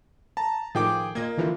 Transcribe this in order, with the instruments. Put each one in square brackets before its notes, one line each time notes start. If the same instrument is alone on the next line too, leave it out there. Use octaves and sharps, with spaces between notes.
[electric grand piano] A5 A#5
[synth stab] A2 D#3 F3 [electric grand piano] G#4 G5 D6
[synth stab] A#2 D#5 G#6 [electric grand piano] A#3
[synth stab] D3 E3 F3